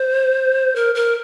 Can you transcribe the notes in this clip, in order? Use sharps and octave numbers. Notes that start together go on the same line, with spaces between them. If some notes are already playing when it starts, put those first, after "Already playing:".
Already playing: C5
A#4
A#4